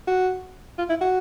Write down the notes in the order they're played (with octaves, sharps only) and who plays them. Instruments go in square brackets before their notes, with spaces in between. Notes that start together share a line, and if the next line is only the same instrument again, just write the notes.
[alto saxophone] F#4
F4
E4
F#4